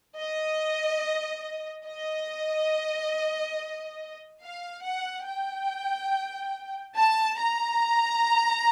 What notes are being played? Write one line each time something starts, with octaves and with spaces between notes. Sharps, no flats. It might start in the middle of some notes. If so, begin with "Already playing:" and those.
D#5
D#5
F5
F#5
G5
A5
A#5